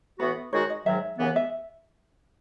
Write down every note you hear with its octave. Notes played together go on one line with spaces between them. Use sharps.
A2 E3 B3 F#4 B4
D#3 G#3 D#4 F#4 C#5
D#5
G#2 D#3 F#3 E5
D#2 C#3 E3 B3
E5